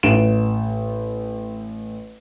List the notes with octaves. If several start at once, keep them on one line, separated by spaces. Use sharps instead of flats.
A1 D7 E7